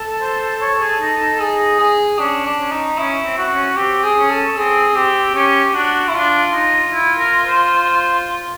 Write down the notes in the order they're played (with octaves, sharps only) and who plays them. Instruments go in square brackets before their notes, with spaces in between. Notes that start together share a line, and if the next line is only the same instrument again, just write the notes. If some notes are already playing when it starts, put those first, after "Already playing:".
Already playing: [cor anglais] A4
[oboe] C5
C#5
G#4
D#4
D#4
[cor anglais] G#4
G#4
[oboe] C#4 [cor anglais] D4
[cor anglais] D4
[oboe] C#4
[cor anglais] D#4
[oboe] C#4 [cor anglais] E4
[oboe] C4
[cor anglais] F#4
[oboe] C#4
[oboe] C4 [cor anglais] G4
[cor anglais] G#4
[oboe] C#4
[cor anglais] A4
[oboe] C4 [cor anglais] G#4
[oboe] C4 [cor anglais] G4
[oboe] C#4 [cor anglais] G4
[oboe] D4 [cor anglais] F#4
[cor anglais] E4
[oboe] D4 [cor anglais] F4
[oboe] D#4 [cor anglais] F4
[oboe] E4
A#4
C5